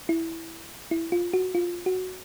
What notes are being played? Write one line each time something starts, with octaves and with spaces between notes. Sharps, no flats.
E4
E4
F4
F#4
F4
F#4